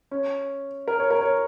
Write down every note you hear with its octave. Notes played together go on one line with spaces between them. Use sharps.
C#4
A#4
C#5
A#4
C#5